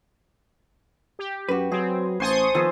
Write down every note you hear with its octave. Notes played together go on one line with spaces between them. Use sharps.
G4
F#2 F#4 B4
F#3 C4 G#4
A1 C5 G#5 A5 C6 C#6 D#6
D#3 F3 B3 G#4 A4